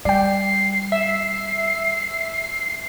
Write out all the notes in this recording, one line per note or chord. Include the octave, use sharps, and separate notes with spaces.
G3 D5 G5 C7
E5